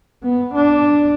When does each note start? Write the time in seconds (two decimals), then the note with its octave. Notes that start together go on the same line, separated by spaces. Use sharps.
0.24 B3
0.55 D4